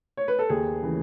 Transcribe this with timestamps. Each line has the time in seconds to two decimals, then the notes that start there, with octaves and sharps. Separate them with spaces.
0.17 C#5
0.28 B4
0.39 A4
0.49 D#2 G#4
0.82 C#3 E3